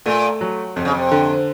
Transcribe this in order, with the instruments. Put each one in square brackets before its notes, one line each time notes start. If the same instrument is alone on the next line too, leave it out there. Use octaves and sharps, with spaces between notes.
[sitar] A#2 [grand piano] A3
[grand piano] F#3
[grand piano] F2 [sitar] C3
[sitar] C#3
C3
[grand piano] D3